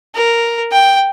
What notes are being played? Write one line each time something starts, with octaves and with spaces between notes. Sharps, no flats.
A#4
G5